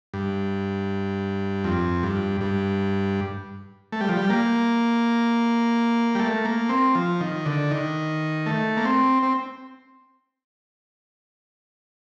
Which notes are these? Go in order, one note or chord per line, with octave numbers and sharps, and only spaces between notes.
G2
F2
G2
G2
A3
G3
F3
G3
A#3
G3
A3
A#3
C4
F3
D#3
D3
D#3
A3
A#3
C4
C4